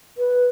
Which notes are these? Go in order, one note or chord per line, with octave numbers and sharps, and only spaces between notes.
B4